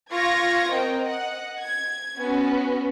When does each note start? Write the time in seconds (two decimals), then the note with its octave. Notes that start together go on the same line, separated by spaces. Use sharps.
0.13 F4 C#6 G#6 A#6
0.72 C4 A#4 D#5 G5
1.00 D#5 F#5
1.62 G#6
2.20 B3 C#4 F#4